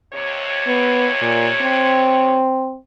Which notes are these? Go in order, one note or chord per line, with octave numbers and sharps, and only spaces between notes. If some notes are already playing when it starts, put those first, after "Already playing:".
D#2 C3 C#5
B3
A#2
C4